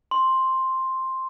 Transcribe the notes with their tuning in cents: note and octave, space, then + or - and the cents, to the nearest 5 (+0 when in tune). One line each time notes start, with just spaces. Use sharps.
C6 +5